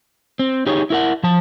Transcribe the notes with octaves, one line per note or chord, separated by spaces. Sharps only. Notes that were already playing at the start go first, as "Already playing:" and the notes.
C4
D#4 G4 G#4 C#5
E4 A#4 F#5
F3 A5